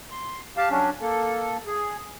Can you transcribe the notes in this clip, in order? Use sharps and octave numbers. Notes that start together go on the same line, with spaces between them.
C6
G4 F5 A5
F#3 C#4 D4
A#3 A4
G#4